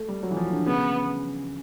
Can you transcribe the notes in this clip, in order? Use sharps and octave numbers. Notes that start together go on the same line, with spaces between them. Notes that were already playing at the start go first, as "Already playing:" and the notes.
Already playing: A3
G3
F#3
E3
F3
D3
C#3 B3